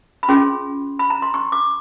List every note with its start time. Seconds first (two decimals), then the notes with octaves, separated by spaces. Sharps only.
0.23 B5
0.28 C#4 F4 G#4 C6
0.99 B5
1.10 A#5
1.22 C6
1.34 C#6
1.52 D6